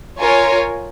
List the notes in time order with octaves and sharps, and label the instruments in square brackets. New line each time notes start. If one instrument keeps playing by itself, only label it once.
[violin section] F4 A#4 C#5 G#5